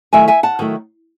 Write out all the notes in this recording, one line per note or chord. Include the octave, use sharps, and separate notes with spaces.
D#3 F#3 A3 E4 E5 G#5
E5 G#5
F#5 A5
D#3 F#3 A3 E4